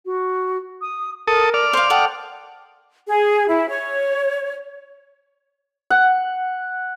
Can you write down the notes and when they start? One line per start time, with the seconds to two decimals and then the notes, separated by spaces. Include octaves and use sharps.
0.06 F#4
0.81 D#6
1.27 A4 A#4 D#6
1.54 D5 F6
1.73 C5 F5
1.90 A4 F#5 G5 D#6
3.07 G#4
3.48 E4
3.69 C#5
5.90 F#5